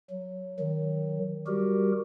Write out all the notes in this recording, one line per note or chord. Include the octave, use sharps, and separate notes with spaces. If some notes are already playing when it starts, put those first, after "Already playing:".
F#3
D#3 F#3
G3 F#4 G4 A#4